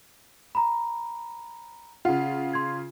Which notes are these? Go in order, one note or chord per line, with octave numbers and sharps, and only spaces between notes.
A#5 B5
C#3 F4 F#5
C6 G#6